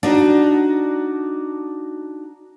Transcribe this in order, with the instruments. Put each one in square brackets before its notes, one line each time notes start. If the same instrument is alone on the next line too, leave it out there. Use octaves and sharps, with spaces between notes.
[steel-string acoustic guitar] D4 D#4 F#4